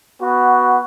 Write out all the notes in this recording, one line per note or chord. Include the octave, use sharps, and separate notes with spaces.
B3 F#4